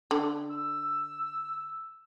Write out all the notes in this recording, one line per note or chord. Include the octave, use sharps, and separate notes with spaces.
D3
E6